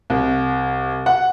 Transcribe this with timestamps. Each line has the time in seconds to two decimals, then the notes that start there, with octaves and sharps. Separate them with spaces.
0.10 C2
1.06 F#5